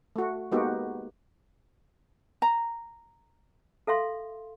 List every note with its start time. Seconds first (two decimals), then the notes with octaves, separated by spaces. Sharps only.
0.16 A3 F#4
0.52 G#3 A#3 B3 D#4 F#4 G4
2.42 A#5
3.87 A4 E5 F5 C6